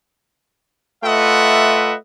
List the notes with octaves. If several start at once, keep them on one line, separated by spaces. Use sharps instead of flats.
A3 F4 B4 D#5 E5 F#5